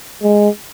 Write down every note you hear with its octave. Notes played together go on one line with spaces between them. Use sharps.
G#3